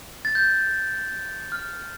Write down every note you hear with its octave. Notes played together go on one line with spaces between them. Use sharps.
A6
G6
F6